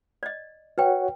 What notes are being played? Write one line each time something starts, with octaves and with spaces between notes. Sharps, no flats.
D5 D#5
F#4 B4 C#5 F#5 G5